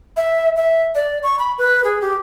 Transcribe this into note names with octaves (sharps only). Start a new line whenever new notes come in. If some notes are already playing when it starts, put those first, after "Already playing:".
E5
E5
D5
C#6
B5
B4
G#4
G4